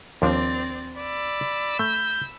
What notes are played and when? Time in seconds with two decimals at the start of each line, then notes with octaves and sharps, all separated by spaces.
0.22 D#2 F3 C4 D4 D5
0.98 D5 B5 E6
1.79 A3 G6